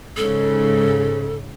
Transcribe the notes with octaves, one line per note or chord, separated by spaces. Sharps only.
G#2 C#3 A4